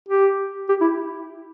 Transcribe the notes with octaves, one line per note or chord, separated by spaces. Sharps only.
G4
G4
E4